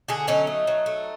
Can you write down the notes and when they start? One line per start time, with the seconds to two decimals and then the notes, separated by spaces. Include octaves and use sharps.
0.08 D3 F#4 G#4
0.28 F#3 C#4 D#4
0.47 A3
0.67 F#3
0.86 A3